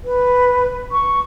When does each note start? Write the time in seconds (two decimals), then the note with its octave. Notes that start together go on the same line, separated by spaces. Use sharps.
0.05 B4
0.92 C#6